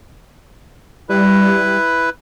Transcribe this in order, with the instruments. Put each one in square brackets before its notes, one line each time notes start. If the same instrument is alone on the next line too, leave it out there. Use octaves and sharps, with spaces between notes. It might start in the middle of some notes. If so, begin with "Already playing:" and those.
[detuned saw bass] G3 [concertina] E4 B4